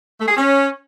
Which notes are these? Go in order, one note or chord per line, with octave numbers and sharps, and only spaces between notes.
A3
G#4
C#4